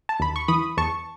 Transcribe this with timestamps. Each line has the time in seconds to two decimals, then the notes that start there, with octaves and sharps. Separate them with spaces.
0.09 A5
0.20 D#2 B5
0.36 C#6
0.48 E3 B5 D#6
0.77 E2 A5 C#6